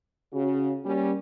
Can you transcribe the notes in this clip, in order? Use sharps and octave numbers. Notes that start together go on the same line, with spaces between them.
C#3 F#4
G3 A#3 C#4